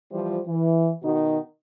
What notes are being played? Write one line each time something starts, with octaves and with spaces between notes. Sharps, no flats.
E3 F3 G3 F4 C5
E3
B2 D#3 D#4 F#4